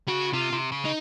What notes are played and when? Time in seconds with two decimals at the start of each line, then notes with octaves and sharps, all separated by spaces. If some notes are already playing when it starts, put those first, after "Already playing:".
0.08 C#3 F#4
0.33 C3 F4
0.53 C3
0.72 C#3
0.85 D#4